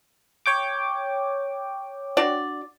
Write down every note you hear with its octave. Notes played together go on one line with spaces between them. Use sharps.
C#5 G5 D6
D4 F#4 D5